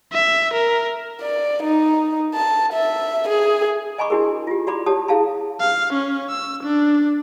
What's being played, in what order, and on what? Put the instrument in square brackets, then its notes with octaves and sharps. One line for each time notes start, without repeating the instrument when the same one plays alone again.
[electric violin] E5
A#4
[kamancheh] D5
D#4
A5
E5
G#4
[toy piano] D#5 G#5 A#5 B5 C#6 D6
D4 E4 F#4 G#4 A#4
F4 G4
F#4 D5 A#5 B5 D6
G4 C#5 A5 D#6
E4 G#4 F5 A5 A#5
[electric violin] F5
C#4
E6
D4